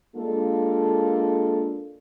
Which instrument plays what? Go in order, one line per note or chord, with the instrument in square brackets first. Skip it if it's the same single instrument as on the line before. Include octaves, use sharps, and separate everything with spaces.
[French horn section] G#3 A#3 D4 F4 A4